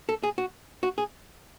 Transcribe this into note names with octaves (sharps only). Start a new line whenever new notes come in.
A4
G#4
F#4
F#4
G#4